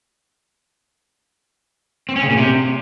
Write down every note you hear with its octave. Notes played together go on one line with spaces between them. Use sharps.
C4
C#4
C#3
A#2
C3